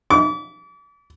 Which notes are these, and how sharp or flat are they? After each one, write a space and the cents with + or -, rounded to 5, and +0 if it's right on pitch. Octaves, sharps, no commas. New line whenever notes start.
D6 -40